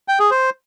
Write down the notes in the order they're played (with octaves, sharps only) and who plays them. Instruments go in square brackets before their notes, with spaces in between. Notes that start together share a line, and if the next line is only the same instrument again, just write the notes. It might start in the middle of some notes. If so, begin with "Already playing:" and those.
[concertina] G5
G#4
C5